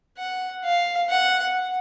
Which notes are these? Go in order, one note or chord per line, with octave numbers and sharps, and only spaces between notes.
F#5
F5
F#5